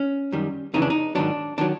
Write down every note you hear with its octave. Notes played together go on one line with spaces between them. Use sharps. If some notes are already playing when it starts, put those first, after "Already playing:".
Already playing: C#4
F#2 D#3 G3
F2 C#3 E3 D#4
D4
D#4
G#2 D#3 F#3 D4
D#3 F#3 D4